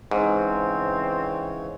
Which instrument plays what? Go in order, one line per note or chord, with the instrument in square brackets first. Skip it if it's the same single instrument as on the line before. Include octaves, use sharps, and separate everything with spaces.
[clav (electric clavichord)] G#2 [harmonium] C#3 E3 C#5 [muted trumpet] C4